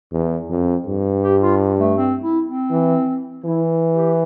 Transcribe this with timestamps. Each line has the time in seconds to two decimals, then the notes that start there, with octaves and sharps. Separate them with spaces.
0.12 E2
0.50 F2
0.87 G2
1.23 G4
1.42 F4
1.79 A3
1.97 C4
2.22 E4
2.46 C4
2.71 E3
3.44 E3 E4
3.94 G4